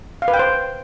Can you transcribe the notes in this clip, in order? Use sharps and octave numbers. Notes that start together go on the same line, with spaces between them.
F5
B4
G5
C5